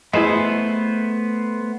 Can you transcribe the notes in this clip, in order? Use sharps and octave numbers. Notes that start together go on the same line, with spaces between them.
A3 B3 E4 G#4 B4 C5 D#5